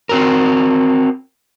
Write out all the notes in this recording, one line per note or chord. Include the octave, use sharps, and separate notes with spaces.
C4 F#4 A#4